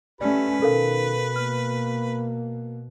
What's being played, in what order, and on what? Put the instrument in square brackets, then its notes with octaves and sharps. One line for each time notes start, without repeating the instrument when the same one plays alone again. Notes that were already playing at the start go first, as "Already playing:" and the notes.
[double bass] A3 C#4 [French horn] G4 [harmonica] B4 [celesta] D5
[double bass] B2 [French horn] D#3 [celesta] A4 A#4 F5
[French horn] A#3 [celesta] F6